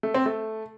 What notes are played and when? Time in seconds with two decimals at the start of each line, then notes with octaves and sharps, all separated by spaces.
0.03 A3
0.14 C4
0.26 A3